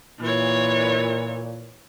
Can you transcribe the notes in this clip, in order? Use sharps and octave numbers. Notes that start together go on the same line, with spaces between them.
A#2 E3 C#5